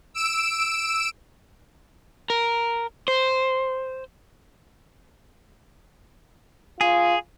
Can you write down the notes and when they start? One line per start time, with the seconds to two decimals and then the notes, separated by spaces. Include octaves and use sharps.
0.14 E6 D7 E7
2.30 A#4
3.08 C5
6.81 F4 G#4